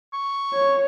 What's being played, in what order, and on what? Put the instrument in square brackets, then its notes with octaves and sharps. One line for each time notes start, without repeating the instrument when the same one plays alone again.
[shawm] C#6
[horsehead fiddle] C#5